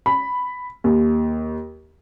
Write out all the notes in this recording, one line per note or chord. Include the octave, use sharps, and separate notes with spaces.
B5
D#2